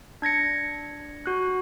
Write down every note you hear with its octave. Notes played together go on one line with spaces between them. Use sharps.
D4 G#6 A#6 C#7
F#4 F#6